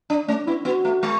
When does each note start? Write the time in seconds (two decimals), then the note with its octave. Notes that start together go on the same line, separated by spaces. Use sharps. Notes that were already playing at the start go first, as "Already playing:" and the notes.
0.10 D4
0.28 A3 C#4
0.47 B3 E4
0.65 B3 F#4
0.85 A3
1.03 G#3